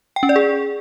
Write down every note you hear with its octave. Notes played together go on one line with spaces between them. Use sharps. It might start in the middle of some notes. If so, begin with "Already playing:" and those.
G5
C#4
D5
G#4